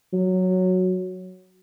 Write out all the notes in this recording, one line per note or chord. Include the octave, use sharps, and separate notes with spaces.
F#3